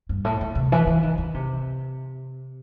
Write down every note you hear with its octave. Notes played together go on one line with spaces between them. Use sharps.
G2
A2
A2
C3
E3
E3
D#3
D#3
C3